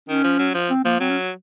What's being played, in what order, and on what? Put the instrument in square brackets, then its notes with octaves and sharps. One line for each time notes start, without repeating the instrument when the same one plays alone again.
[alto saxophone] D#3 [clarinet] C#4
[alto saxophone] F3
F#3
F3
[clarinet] C4
[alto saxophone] F3 [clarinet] A#3
[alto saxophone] F#3 [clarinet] C4
[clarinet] C#4